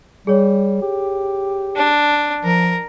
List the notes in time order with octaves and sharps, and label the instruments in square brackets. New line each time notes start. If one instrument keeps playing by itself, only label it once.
[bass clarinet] G3 [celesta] G#4 C#5
[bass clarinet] G4
[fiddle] D4
[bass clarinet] F3 [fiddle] A#4